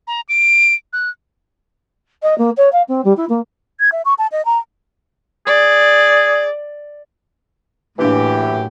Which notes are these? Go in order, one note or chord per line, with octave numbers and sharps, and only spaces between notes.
A#5
D7
F#6
D#5
A#3
C#5
F5
C4
G3
E4
A#3
G#6
E5
C#6
A5
D#5
A#5
G#4 D5
F#2 A2 E3 A#3 D4 G4 F5